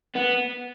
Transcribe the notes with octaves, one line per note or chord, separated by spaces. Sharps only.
B3